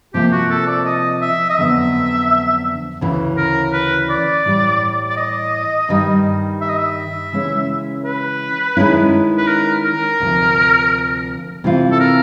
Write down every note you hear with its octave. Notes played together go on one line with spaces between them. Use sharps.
C3 F3 A#3 G4
F#4
A4
D5
D#5
E5
D#5
F2 D3 F#3 B3 E5
D2 C#3 E3
A#4
B4
D5
A2 E3 G3
D5
D#5
G2 D#3 G3
E5
D#5
E5
C#3 E3 G#3 C#4
B4
D#3 G#3 C#4 E4
B4
A#4
A#4
D2 C3 F3
C3 E3 A3 C4 F4
A4
A#4